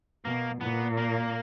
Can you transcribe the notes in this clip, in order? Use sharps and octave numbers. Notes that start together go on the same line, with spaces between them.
B2 A#3
A#2 B3
A#3